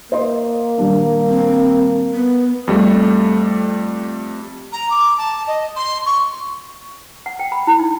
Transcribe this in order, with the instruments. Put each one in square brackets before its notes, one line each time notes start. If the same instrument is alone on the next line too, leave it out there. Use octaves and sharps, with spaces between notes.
[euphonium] A#3 [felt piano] C5 D#5 C6
[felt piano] D#1 G3 D4
[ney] C4
B3
[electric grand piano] F2 G3 A3
[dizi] A#5
D6
A5
D#5
C6
C#6
[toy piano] F#5
G5
B5
E4
D#4